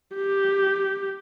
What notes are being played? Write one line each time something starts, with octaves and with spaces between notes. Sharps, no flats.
G4